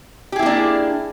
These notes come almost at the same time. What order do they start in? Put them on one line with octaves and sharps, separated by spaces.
G4 G#4 E4 A#3 D4